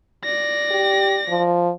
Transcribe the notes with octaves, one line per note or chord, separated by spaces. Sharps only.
D5 A#6
G4
F3